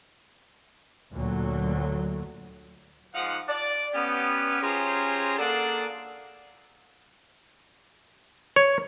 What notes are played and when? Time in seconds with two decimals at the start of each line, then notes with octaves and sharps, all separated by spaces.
1.13 D2 A#2 F#3
3.14 G#2 F3 D#4 F5 F#5
3.49 D5
3.94 B3 C#4 G4
4.62 C#4 F4 G4 G#4 C5 A#5
5.38 A#3 D4 G#4 A4 D5 F#5
8.56 C#5